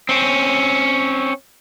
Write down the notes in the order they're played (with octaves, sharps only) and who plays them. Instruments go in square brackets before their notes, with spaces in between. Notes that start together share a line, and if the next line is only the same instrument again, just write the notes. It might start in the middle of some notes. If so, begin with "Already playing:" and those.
[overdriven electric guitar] C4 C#4